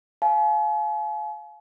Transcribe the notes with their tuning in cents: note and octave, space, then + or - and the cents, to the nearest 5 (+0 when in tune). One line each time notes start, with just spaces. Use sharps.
F5 +0 G#5 +45